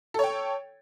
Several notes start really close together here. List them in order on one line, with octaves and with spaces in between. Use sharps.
A4 C#5 G5